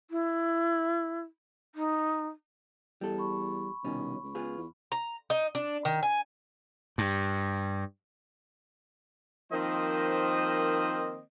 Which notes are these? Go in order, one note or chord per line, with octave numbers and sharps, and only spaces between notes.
E4
D#4
E2 G3 A4
B5 C#6
C2 B2 D#3 C#4
C#2
B3 F4 G#4
E2
A#5
D#4
D4
D#3
G#5
G2
D#3 F3 A#3 C4 C5 D#5